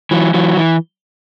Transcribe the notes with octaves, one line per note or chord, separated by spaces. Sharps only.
E3 F#3
E3 F#3
E3